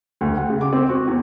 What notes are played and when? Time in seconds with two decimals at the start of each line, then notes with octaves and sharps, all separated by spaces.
0.21 D2
0.37 F#5
0.50 C#3
0.61 D6
0.73 C4
0.89 F#4
1.07 E2